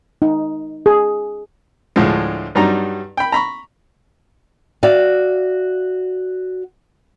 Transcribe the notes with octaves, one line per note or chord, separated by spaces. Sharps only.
D#4
G#4
D2 A2 D3 F3 G#3
G2 F#3 G3 D#4 A#5
G5 B5
A#5 B5 C#6
F#4 D5 E5 F5